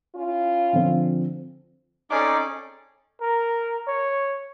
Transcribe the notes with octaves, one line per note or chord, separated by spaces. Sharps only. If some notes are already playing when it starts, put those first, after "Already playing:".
C#4 E4 F4
D3 F3 C4
C4 C#4 D#4 G#4 A4 D5 D6
A#4
C#5